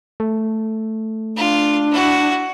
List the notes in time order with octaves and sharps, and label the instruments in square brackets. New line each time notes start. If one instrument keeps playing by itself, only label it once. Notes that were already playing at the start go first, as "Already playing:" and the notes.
[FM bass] A3
[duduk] D4 [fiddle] F4
[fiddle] E4 F#4